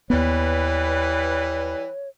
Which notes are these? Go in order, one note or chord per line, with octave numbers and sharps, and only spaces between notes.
D#2 E3 G3 B3 B4 C#5